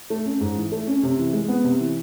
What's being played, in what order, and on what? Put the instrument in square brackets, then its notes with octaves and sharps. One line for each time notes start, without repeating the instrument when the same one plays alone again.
[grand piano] A3
C#4
G#2
E3
A3
C#4
C3
E3
G#3
B3
C3
E3